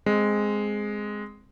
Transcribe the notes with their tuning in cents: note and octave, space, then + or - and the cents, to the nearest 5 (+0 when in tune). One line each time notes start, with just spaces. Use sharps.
G#3 +0 C4 +0